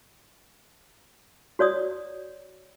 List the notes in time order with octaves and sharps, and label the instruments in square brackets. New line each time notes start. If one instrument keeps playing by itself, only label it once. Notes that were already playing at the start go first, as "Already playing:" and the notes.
[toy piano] F#4 C#5 D5 D#6